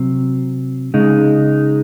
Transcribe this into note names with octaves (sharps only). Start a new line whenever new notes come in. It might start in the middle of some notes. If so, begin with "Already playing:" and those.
Already playing: C3 F#3 C4
C#3 G#3 D#4